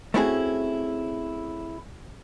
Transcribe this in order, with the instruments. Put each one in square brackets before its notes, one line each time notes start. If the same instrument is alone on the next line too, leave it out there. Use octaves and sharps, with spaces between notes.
[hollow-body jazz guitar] A3 C4 C#4 E4 F#4 G#4